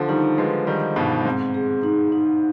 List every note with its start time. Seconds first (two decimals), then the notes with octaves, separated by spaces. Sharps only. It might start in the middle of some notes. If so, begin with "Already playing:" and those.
Already playing: D3 F3
0.08 D#3 G3 D#4
0.38 F3 G#3 B4
0.67 D#3 G3 D#5
0.96 G2 B2 D#4
1.25 G#2 C4
1.54 G#4
1.83 D#4
2.12 D#4